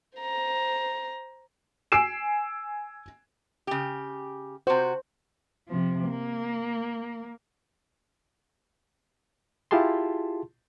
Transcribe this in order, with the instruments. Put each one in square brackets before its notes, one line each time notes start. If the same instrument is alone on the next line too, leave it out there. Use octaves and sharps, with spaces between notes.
[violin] C5 A#5
[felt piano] G#5 E6 C7 D7 E7
[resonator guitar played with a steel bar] C#3 G4
[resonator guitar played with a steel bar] C3 F#4 [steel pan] C5
[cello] C3 F3
A#3
[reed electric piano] E4 F4 G4 G#4 A5 C6